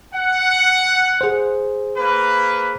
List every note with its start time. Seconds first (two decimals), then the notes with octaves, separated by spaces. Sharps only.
0.14 F#5
1.21 G#4 C5
1.97 A#3 B4